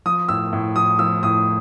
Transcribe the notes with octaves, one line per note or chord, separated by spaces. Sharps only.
F3 D#6
A2 E6
A2
F3 D#6
F3 E6
A2 D#6